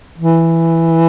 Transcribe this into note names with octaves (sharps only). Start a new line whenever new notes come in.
E3